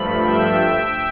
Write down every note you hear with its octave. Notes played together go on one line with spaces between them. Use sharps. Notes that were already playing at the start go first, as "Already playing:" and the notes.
Already playing: G2 F3 A3 B5
E5 G5